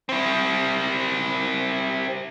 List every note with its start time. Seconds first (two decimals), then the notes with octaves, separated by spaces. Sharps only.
0.09 C4 E4